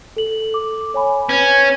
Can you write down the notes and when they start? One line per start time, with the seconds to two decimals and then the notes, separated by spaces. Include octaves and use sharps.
0.17 A4 F#7
0.54 D6
0.94 C#5 G#5 B5
1.29 C#4 B4